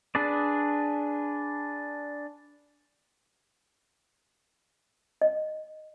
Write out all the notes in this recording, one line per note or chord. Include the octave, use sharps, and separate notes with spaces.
D4 G#4 B4 D5
D#5